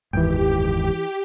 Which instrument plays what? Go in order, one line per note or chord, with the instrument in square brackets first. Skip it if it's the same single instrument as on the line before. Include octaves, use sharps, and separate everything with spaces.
[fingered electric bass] F#1 D#2 G#2 [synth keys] E3 G5 [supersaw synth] G4